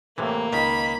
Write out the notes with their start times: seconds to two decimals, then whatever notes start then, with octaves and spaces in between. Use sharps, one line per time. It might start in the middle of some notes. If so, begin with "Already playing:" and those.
0.18 A2 C3 E3 A#3
0.53 C#2 D#3 B5